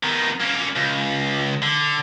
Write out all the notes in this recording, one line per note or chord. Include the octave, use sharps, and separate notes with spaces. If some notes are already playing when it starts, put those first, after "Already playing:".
D#3 B3
A#3 C#4
C#2
D3